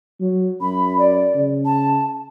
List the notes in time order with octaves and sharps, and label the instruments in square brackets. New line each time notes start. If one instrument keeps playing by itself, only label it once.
[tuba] F#3
[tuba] F#2 [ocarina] B5
[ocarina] D5
[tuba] C#3
[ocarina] A5